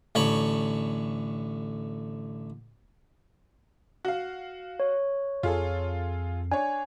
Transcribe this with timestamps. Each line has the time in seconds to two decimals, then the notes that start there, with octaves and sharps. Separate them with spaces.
0.15 A1 D3 C#5 B5
4.05 F#4 F5
4.80 C#5
5.43 F2 F4 G#4 A4
6.52 D4 C#5 G#5